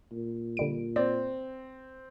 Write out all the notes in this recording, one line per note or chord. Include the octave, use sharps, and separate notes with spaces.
A#2
D3 G3 D7
C4 D5